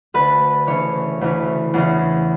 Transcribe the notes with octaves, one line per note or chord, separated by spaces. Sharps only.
D2 D3 B4
D2 C#3 E3 C#5
D2 C#3 E3
E2 C#3 E3